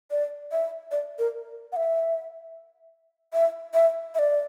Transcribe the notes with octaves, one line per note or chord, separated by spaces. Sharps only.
D5
E5
D5
A#4
F#5
E5
E5
E5
E5
D5